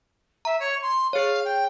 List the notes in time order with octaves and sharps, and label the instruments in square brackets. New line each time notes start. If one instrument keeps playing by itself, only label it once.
[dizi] E5 [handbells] A#5
[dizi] C#5
C6
[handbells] G#4 C#5 [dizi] F5
[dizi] G5